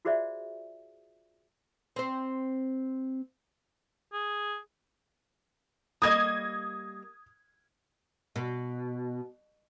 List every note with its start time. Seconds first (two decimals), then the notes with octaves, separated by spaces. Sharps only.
0.05 F4 F#4 G#4 C5 D5 E5
1.96 C4 C5
4.13 G#4
6.02 G3 A#3 D#5 D#6 G#6
8.36 B2